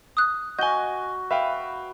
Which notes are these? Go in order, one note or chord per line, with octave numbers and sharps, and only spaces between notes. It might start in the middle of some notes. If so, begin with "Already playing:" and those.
D#6 F#6
F#4 D#5 G#5 G6 G7
B4 E5 F5 G5